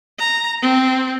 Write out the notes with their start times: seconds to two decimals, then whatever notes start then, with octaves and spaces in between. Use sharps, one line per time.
0.19 A#5
0.62 C4